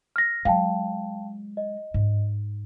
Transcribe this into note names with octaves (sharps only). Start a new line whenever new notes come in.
F6 A#6
F#3 G#3 F5 G5 A5
D#5
G#2